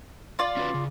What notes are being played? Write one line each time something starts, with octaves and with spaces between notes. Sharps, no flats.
F4 D5
C#4 F#4 B4
C#3